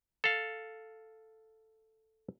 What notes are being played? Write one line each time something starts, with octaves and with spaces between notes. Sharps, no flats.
A4 F5